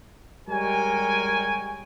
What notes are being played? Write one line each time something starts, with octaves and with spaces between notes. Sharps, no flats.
G3 G#3 A#4 C#5 G5 G#5